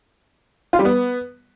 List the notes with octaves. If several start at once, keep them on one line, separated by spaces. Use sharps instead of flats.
F4
G3
B3